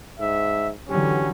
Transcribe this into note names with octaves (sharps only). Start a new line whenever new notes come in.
G#2 E5
D3 E3 F#3 C#4 G4